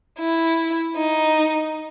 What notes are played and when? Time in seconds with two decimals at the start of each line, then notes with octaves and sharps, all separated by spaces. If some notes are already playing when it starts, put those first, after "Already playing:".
0.18 E4
0.95 D#4